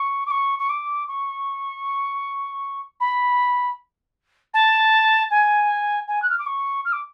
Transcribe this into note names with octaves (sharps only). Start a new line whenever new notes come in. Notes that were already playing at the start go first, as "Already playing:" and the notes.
Already playing: C#6
D6
C#6
C#6
D6
C#6
B5
A5
G#5
G#5
F#6
F6
D6
C#6
F6
D6